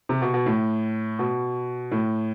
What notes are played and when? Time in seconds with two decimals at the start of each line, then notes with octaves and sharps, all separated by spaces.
0.09 C3
0.22 B2
0.34 B2
0.46 A2
1.19 B2
1.92 A2